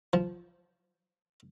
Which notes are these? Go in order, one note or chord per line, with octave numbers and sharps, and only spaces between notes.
F3